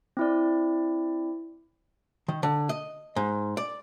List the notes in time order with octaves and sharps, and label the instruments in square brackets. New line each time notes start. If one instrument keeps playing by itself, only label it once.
[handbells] C4 E4 D5
[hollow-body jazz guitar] D#3
D3
D#5
G#2
D5